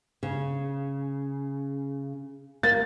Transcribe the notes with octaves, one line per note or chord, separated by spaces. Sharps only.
C#3
A#3 A6